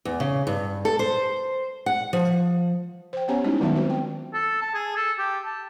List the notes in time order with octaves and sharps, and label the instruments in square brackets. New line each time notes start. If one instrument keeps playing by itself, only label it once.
[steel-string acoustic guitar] E2
C#3
G2
A4
C5
F#5
F3
[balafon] C5 G5
B3 C#4 G4 C#5 G#5 A#5
G3 G#3 C#4 D#4 E4 F#4
D#3 F#3 B3 F4 E5 A5
C4 F#4 C5
G5
[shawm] A4
A5
G#4
A4
G4
A5